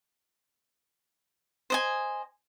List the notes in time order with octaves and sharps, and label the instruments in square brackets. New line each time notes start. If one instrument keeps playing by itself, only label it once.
[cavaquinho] C5 D#5 G#5